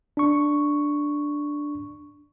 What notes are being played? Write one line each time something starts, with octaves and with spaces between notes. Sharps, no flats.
D4 C#6